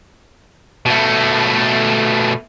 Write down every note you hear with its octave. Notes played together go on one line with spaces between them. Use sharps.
B2 A3